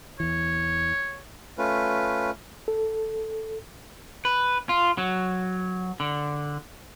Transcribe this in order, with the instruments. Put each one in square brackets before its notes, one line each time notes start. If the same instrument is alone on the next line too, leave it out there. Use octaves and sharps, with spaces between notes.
[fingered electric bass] E2 E3 [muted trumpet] C#5
[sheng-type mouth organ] A3 C#4 F4 B4
[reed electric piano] A4
[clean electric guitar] B4
F4
F#3
D3